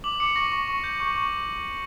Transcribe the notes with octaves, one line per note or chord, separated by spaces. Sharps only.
D6 F#7
D6 C#7
C#6 A#6
C#6
C#6
G6
C#6
C#6